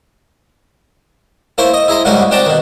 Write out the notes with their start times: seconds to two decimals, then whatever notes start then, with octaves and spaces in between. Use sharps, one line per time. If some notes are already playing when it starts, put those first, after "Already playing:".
1.58 A#3 E4 A#4 C5 C#5
1.74 D#5
1.88 E4 G#4 A#5 C6
2.05 G#2 C#3 G3 A#3 D#4 F#4
2.31 C4 D4 F#4 G5 A5 A#5
2.46 B2 D#3